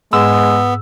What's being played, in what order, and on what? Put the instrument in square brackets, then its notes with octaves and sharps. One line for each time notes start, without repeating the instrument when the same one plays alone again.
[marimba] G#2 [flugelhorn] G#3 [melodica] B3 [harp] E6